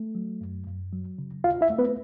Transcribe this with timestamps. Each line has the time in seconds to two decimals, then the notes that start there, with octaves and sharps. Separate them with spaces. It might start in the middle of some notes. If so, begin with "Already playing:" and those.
Already playing: A3
0.15 F#3
0.41 F#2
0.67 F#2
0.93 F#3
1.18 C#3
1.44 D#2 F4 F5
1.61 E4 E5
1.70 A3
1.78 B3 B4